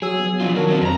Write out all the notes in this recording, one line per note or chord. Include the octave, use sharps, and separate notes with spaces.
F#3 G#4 E6
F#3 B3
F3 D4 F4
D#3 F#3 A#4 A5
F#3 C4 D4
F2 C4 B4 A#5